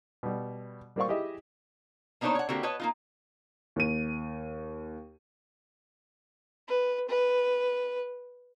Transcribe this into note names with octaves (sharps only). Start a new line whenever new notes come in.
B2 G3
G3 A#3 C5 D5 F5 C#6
E4 G4 G#4 D#5 E5
A#3 B3 D4 D#4 C5 C#5
C#5 F#5
D3 A#3 C4 F#4 G4
B4 C#5 D#5 A5
A#3 D#4 F4
D#2 D#7
B4
B4